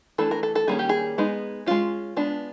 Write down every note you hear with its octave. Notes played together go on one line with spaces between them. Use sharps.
E3 A3 D4 A4
A#4
A4
A4
D#3 G3 A#3 C#4 G#4
G4
G#4
G#3 B3 D#4
G#3 C#4 F4
G#3 B3 D4